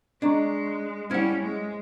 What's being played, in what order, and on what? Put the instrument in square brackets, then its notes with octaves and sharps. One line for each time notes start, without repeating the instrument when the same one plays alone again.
[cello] G#3 [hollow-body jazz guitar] D4 [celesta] D#5 A#5 C#6
[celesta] C6 F#6
[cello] G3 C#4 [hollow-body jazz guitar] E4 F#5 [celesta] C5 F6 G#6
[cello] G#3